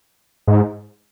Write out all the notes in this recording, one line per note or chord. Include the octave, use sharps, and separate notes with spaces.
G#2